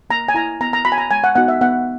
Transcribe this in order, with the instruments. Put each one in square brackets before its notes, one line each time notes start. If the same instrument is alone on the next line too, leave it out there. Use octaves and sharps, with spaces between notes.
[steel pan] A#3 A#5
G#5
E4 A#5
B3 A#5
A#5
F#4 B5
G#5
A#5
G#3 G#5
F#5
B3 D#4 F#4 F#5
E5
B3 F#5